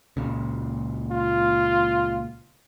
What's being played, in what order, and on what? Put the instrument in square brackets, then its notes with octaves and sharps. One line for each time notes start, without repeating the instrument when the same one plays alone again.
[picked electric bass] C#2 A#2 C#3
[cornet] F4